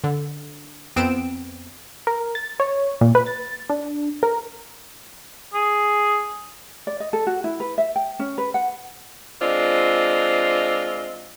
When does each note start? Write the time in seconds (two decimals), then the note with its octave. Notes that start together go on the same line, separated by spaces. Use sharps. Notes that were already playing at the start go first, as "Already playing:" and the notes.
0.04 D3
0.96 F2 B3 C4 D7 E7
2.07 A#4
2.35 A6
2.60 C#5
3.01 A#2
3.15 B4
3.26 A6
3.70 D4
4.23 A#4
5.54 G#4
6.87 D5
7.00 D#5
7.13 A4
7.27 F#4
7.44 E4
7.60 B4
7.78 E5
7.96 G5
8.19 C#4
8.38 B4
8.54 F#5
9.42 G#3 C4 D4 F4 D#5